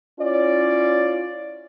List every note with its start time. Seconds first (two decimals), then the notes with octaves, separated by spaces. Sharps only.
0.20 C#4 E4 F4 C#5 D5